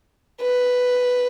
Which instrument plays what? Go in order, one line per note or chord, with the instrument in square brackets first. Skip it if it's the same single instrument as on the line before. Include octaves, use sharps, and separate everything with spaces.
[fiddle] B4